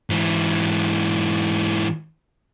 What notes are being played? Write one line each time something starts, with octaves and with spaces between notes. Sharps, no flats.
G#2 E3